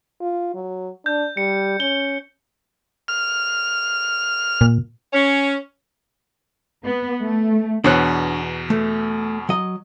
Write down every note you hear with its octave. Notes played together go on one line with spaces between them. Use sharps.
F4
F#3
D4 G6
G3 C#7
C#4 G7
F6
A#2
C#4
B3
A3
E2 B2 D4 C5 C#5 F#6
A3
F#3 D#5